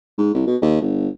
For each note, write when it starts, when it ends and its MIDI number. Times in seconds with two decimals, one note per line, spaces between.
0.18 0.33 44
0.34 0.46 36
0.47 0.56 47
0.62 0.80 39
0.82 1.09 31